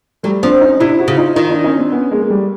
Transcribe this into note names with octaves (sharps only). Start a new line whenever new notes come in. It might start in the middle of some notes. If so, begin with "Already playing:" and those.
F#3 G3 A3
F3 C4 D4
C#4 D#4
C3 D4 E4
E4 F#4
C#3
D#4 F4
D#3 D#4 F4
D4 E4
C#4 D#4
C4 D4
B3 C#4
G#3 A#3
G#3
G3 A3